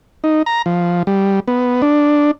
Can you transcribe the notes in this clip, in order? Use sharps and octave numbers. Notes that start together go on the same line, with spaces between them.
D#4
A#5
F3
G3
B3
D4